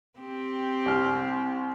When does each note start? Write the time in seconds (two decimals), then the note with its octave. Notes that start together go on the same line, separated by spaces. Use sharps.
0.18 C4 G4
0.86 C2 F6